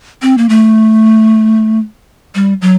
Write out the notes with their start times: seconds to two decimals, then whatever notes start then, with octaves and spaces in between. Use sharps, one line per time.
0.22 C4
0.38 A#3
0.49 A3
2.35 G3
2.62 F#3